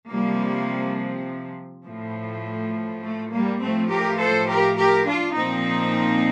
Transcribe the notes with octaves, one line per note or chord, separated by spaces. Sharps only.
C3 F3 G3 A#3
A2 F3
A3
G3 A#3
A2 F3 A3 C4
G4 A#4
A4 C5
G4 A#4
G4 A#4
D4 F4
A#2 F3 C4 D#4